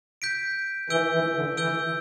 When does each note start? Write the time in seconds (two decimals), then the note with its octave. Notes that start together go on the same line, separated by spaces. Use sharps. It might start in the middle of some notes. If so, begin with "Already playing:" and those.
0.22 G6 B6 D7
0.90 E3 E6 G6 D7 G7
1.13 E3
1.34 D3
1.57 E3 E6 G6 D7 G7